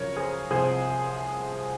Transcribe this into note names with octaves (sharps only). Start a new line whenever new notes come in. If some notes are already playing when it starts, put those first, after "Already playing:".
Already playing: F#2 C#3 F3 A#4 C#5
G#4 C5
C2 C3 F3 G#4 C5